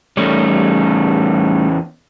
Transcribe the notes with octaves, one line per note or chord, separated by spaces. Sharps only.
E2 G3 A3 C#4 D#4